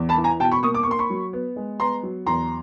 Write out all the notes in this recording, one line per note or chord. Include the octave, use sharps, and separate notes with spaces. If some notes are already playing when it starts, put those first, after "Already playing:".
Already playing: E2
A5 B5
E3
G#5 A#5
B2 G5 A5
B5 C#6
A#3 C#6 D#6
D6
C#6
A#3 C6
B5 C#6
F#3
B3
G#3
B3 A#5 C6
F#3
E2 A#5 C6